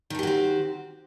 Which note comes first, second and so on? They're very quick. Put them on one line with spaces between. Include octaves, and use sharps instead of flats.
D#3 A4 G4 F#4 C4